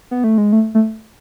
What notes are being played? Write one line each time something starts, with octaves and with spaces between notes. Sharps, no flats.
B3
A3
G#3
A3
A3